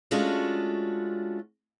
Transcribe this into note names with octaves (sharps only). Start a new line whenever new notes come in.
G#3 A3 C#4 D4 F4 F#4